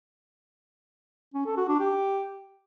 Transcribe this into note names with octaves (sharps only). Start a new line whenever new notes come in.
C#4
A4
F#4
D4
G4